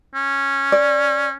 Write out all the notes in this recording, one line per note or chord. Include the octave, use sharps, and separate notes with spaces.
C#4
D5